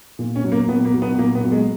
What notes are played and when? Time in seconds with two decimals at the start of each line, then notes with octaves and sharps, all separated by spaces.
0.19 A#2
0.36 C#4
0.44 F#3
0.52 A#3
0.68 A#2 B3
0.85 A#3
0.94 F#3
1.02 B3
1.18 A#2 A#3
1.35 B3
1.43 F#3
1.52 G#3